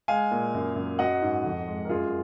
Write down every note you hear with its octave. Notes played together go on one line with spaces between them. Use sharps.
G#3 F5 G#5
A#2
F#2
F#2
F#3 D#5 F#5
G#2
F2
G#3
A#4
F#2 F4 G#4